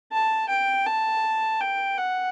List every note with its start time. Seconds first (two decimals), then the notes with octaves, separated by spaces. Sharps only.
0.12 A5
0.49 G5
0.87 A5
1.61 G5
1.97 F#5